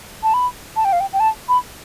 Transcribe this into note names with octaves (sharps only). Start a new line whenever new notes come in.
A5
B5
A5
G5
F5
G5
G5
A5
B5